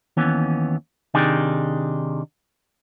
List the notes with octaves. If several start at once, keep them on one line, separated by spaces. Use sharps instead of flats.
D#2 E3 B3 C#4
C3 D#3 D4 D#4 G4 G#4